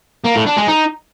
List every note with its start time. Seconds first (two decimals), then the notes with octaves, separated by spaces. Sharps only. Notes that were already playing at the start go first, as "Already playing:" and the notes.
0.24 A#3
0.35 A2
0.46 D4
0.57 G#3
0.67 D#4